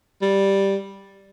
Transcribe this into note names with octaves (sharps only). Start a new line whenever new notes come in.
G3